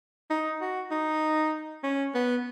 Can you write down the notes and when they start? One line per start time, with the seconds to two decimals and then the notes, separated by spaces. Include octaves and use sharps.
0.30 D#4
0.61 F#4
0.91 D#4
1.84 C#4
2.15 B3